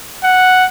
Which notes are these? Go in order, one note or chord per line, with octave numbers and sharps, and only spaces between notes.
F#5